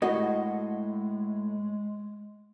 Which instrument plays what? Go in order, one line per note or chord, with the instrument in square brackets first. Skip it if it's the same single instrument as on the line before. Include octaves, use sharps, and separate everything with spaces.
[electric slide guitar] A2 [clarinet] G#3 [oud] F#4 [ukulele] D#5